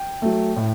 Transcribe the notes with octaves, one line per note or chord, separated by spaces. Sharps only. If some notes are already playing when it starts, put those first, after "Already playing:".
Already playing: G5
F#3 A3
A2